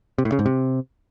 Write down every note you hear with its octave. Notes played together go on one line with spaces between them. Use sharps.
C3
A2
C#3
G#2
C3